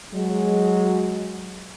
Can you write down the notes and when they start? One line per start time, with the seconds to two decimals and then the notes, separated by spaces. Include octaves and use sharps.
0.13 F#3 G#3